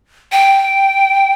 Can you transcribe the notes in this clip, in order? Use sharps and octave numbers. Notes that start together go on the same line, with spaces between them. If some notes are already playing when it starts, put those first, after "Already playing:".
G5